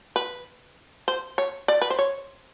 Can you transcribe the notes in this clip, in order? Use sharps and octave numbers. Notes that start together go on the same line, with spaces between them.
B4
C5
C#5
D5
B4
C5
C#5